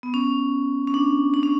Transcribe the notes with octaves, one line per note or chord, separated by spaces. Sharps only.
B3
C#4
C#4
D4
D4
C#4